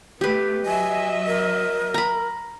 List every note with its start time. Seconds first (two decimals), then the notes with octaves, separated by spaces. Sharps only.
0.21 A3 B3 G4 B4
0.66 F#3 D#5 E5 G#5
1.27 A#4
1.94 A#5 B5